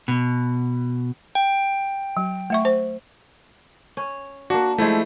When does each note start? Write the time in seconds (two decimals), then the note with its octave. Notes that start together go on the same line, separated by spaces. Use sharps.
0.08 B2
1.35 G5
2.17 F#3
2.50 A3 E5 C#6
2.65 C5
3.97 C#4
4.50 A#3 D4 F#4
4.78 F3 G#3 A3 E4